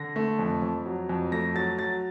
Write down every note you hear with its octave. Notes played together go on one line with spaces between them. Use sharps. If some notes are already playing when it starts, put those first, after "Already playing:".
Already playing: D3 A#6
A3
F2
F2
F#3
F2
A3 A#6
F#3 A6
F#3 A6